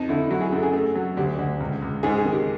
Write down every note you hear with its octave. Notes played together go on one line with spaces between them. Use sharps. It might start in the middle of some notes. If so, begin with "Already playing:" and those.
Already playing: F2 D#4
D3 E4
F#3 E4
G#4
F#2 A4
G#4
A3
F#3
D2 G4
D2
C#2
C#2
G#2 G#4
G#4
D#3
G4